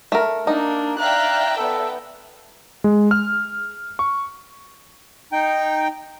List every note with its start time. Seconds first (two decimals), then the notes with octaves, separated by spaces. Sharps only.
0.12 A3 A#4
0.47 A#3 D4 D#4
0.99 D5 E5 F5 G5 A#5 F#6
1.57 B3 A4
2.84 G#3
3.11 F6
3.99 C#6
5.32 D#4 G5